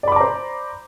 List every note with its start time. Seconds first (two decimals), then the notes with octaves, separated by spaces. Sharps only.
0.03 D5
0.08 B5
0.12 D6
0.16 A#5
0.21 C5